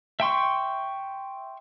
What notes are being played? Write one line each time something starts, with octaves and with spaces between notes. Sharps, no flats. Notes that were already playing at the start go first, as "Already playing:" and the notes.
E5 G5 C6 C#6